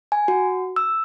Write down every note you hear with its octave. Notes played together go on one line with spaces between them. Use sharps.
G#5
F#4
E6